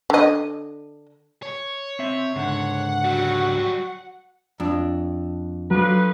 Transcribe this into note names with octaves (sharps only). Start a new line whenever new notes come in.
D3 D#5
C#5
C4 E5
C#2 G#2 D3 F#5
F#3 G3 F#4
F2 D4
D3 F3 F#3 B4